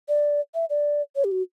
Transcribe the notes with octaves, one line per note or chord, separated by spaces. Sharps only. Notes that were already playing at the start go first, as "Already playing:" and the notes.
D5
E5
D5
C#5
G4
F#4